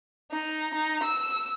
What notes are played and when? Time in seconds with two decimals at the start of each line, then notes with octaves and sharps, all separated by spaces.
0.32 D#4
0.74 D#4
1.04 E6